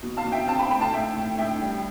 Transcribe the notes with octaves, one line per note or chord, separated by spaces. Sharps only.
B2
F5 A5
B2
E5 G5
C4 F5 A5
G5 B5
A3 G5 B5
F5 A5
A2 E5 G5
A2
A2 E5 G5
G3